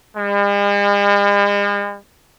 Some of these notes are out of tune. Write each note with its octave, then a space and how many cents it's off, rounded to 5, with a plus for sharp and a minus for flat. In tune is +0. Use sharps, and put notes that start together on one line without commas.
G#3 -45